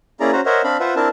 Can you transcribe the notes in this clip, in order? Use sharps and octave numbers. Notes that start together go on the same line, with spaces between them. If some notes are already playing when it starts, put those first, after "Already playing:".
A#3 C#4 E4 G#4 D5 A#5
C#4 F#4 C5 A#5
A#4 C5 C#5 D#5 E5 F#5
C4 D4 F5 B5
F4 B4 C5 E5 F#5
C4 D4 E4 A#4 A5